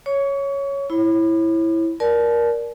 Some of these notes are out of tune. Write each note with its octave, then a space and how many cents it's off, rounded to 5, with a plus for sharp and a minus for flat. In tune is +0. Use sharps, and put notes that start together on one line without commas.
C#5 +0 C#6 +30
E4 +0 C#5 -35 B5 +0
A#4 +15 D5 +0 A5 -35